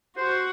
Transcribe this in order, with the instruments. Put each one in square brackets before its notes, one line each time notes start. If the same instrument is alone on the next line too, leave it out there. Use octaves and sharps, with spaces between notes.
[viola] F#4 [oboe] C5